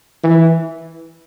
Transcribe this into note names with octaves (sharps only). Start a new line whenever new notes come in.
E3